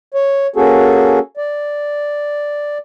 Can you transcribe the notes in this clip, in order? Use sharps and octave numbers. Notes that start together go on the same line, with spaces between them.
C#5
A#3 C#4 F#4 G#4 A4
D5